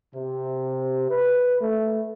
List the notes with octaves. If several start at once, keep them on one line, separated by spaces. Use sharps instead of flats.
C3
B4
A3